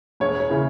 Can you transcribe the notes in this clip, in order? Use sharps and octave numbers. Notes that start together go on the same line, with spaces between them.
E1 C#5
C#5
C#3 E3